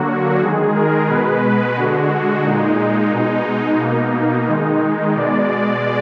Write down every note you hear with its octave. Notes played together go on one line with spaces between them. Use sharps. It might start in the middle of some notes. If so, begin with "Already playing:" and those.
Already playing: D3 F#3 A#3 F#4
D#3 G#3 G#4
A#4
B2 G#3 B4
D3 G#3 F#4
A#2 G#3 D#4
B2 G#3
B2 A#3
D#3 G#3
B2 G#3 D5